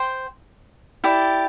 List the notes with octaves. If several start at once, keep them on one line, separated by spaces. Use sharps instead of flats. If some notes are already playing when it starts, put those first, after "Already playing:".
Already playing: C5 G5 C6
E4 G4 D5